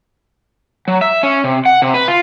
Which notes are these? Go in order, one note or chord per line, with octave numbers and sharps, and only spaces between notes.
F#3
E5
C#4
C3
F#5
C3
B4
F4